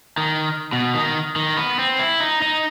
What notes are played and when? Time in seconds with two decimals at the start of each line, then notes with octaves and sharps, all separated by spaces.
0.18 D#3
0.73 B2
0.95 D#3
1.36 D#3
1.57 B3
1.79 C4
1.99 E4
2.20 D#4
2.42 D#4